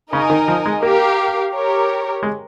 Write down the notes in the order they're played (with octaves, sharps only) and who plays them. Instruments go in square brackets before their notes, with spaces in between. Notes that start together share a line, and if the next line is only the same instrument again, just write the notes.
[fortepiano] C#3 [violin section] D#4 A#4 D#5 G#5
[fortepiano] D#3
F3
G#3
[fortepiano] A#3 [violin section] G4 A#4 F5
[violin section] G4 A#4 C#5
[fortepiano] G#3